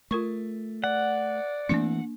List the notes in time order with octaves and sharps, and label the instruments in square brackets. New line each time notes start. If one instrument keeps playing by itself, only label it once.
[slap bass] A3 [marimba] F4 A#4 C#6
[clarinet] D5 [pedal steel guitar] F#5
[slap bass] E3 A3 C4 [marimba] A#3 D4